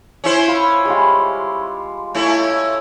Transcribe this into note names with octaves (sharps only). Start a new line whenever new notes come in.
C#4 E4 C5
F4 B5
G3 G#3 F4
A3 C#4 E4